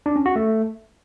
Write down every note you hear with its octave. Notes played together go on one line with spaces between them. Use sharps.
D4
C#4
F#4
A3